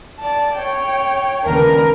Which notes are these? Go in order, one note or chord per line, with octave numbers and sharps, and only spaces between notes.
D5 A5
C#5 G5
D#2 C#3 D4 A#4 B4